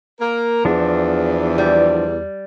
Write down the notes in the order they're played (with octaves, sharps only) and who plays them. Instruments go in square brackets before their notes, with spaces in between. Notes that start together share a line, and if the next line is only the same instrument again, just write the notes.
[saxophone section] A#3 A#4
[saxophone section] E2 [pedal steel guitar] F3 D4
[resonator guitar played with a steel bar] G3